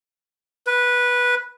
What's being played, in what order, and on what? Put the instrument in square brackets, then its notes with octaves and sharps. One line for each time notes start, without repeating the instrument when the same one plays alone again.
[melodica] B4